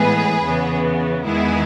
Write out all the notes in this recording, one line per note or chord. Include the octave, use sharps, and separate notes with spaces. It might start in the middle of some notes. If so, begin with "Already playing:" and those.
Already playing: A2 E3 G#3 B3 G#4 B4
E2 C#3 E3 B3
E2 D#3 G#3 B3 E4 G#4